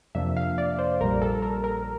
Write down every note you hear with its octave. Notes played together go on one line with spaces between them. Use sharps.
F2 C3 F3 A#3 D4 E5
F5
D5
C5
A#1 A#2 G3 A#4
A4
A#4
A#4